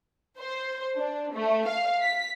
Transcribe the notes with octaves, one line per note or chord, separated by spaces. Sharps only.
C5
D4
A3
F5
B6